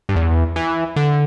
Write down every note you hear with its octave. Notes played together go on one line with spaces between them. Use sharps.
G2
E2
E3
D3